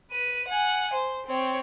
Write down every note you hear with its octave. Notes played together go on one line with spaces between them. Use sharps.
B4 D#7
F#5 G#5
C5
C4 C#5